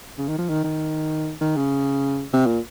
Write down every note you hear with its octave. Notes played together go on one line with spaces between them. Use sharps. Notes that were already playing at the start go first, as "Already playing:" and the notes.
C#3
D#3
F3
D#3
D#3
D#3
C#3
C3
A#2